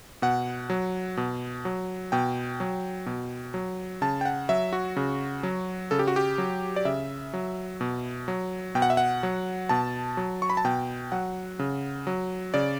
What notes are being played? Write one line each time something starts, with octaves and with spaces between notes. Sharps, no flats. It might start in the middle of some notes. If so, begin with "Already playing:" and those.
B2 F#5
F#3
B2
F#3
B2 G5
F#3
B2
F#3
C#3 A5
G5
F#5
F#3 E5
F#4
C#3
F#3
C#3 A4
G4
F#4
G4
F#3
D5
C#3 E5
F#3
B2
F#3
B2 G5
F#5
E5
F#5
F#3
B2 A5
F#3
C#6
B5
A5
B2 G5
F#3 F#5
C#3
F#3
C#3 D5